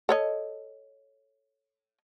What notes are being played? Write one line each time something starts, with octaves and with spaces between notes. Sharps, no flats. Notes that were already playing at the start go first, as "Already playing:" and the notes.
A4 C#5 D#5